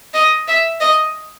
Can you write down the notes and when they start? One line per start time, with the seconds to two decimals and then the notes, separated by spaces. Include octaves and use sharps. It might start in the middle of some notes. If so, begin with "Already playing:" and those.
0.14 D#5
0.48 E5
0.80 D#5